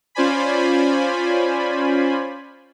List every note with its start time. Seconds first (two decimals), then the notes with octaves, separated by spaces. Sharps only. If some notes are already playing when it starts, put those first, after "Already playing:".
0.15 C#4 F4 C5 D5 G#5 B5